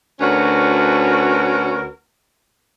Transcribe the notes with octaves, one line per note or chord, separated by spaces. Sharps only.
D2 C#4 F#4 A#4 B4 C#5